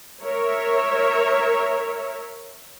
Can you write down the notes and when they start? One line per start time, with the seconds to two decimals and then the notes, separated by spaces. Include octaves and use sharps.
0.23 A#4 C#5 E5